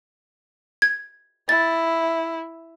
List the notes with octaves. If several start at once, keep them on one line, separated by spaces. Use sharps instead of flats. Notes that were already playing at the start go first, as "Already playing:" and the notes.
G#6
E4 A6